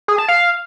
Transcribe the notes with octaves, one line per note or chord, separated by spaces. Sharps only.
G#4
A5
F5